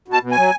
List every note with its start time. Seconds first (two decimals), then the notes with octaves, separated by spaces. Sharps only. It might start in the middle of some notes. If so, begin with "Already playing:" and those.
0.08 B2 A5
0.23 B2
0.32 G#5
0.37 F#3